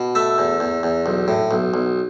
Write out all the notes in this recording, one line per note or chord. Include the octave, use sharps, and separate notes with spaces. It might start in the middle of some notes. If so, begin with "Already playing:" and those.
Already playing: B2
A3 E5
E2
E2
E2
B1
A2
B1
B1